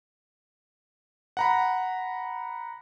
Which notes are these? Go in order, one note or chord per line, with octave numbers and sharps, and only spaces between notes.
F#5 A#5 B5